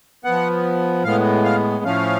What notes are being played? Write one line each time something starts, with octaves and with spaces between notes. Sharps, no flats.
F3 B3 F#5
A2 G#3 B3 F5
F5
A2 F3 A3 C#4 F5